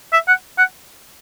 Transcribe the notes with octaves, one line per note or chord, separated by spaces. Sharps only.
E5
F#5
F#5